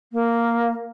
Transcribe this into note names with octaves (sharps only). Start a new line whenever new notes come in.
A#3